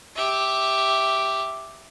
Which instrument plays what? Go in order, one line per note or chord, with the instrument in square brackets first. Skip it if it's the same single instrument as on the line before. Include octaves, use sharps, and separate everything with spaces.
[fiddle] G4 E5